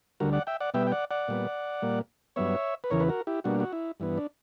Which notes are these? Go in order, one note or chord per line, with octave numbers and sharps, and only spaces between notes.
D2 D3 G3 F#4 A#4
D5 F#5
E5 G5
D5 F#5
B2 G3 B3 E5 G5
G5
D5 F#5
D5 F#5
A#2 G3 B3
A#2 G3 A#3
G2 F#3 B3 C#5 E5
B4
E2 C#3 E3 A#4 C#5
B4
F#4 A#4
E4 G4
B2 G3 A#3 D4 F#4
F#4
E4
G2 E3 B3
D4